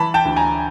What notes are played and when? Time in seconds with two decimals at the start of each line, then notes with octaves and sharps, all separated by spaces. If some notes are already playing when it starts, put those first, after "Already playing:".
Already playing: E3 A5 B5
0.14 G5 A5
0.25 D2
0.36 G#5 A#5